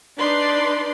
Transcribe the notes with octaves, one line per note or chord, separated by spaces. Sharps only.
D4 D#4 B4 D5 C6